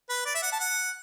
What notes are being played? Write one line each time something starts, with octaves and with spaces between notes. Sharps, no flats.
B4
D5
E5
F#5
A5
F#5